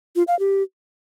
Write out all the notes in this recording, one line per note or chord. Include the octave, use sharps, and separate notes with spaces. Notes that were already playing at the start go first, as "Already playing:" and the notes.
F4
F5
G4